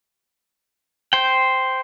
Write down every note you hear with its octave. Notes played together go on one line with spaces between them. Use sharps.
C5 G5